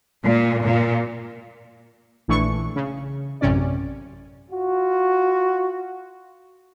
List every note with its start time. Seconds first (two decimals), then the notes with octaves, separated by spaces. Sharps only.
0.24 A#2
0.64 A#2
2.28 A#1 E3 A3 D4 C#6
2.76 C#3
3.41 A1 F#2 C3 C#4 D5
4.51 F4 F#4